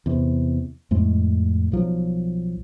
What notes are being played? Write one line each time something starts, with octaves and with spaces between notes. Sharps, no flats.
E2 C3
F2 A2 G#3 A3
B1 F3 F#3